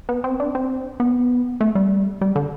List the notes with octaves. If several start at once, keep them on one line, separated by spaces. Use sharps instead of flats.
B3
C4
D4
C4
B3
A3
G3
G3
D3